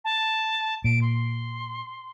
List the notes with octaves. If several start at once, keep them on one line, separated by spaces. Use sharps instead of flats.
A5
A#2 D7
C6